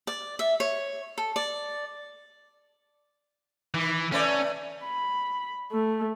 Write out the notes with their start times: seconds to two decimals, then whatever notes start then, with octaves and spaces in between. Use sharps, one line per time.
0.07 D5
0.39 E5
0.60 C#5
1.18 A4
1.36 D5
3.74 D#3 E3
4.12 A3 C#4 B4 D5
4.84 B5
5.72 A3